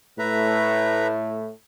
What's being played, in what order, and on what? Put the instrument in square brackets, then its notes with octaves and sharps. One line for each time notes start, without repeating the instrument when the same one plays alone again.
[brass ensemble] A2 A3 [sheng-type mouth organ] B4 E5 A#5